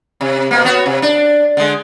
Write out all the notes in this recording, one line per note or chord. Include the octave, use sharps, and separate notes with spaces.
C3
B2 A#3
B3 F#4 C#5
C3
D4
D3 G#3